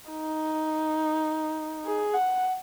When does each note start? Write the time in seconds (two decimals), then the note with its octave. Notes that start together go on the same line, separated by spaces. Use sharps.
0.10 D#4
1.85 G#4
2.14 F#5